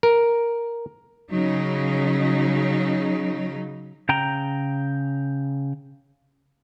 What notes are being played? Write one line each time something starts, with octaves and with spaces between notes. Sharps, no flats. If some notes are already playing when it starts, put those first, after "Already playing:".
A#4
C#3 F#3 D#4
C#3 G5 A#5